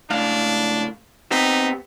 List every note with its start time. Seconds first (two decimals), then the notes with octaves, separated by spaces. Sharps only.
0.10 C#2 A2 D4 F5
1.31 B3 C4 D#4 G4